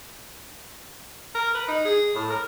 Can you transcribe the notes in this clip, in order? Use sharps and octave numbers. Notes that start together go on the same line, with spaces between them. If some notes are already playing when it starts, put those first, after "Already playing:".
A#4
B4
D#4
G#4
A2
A#4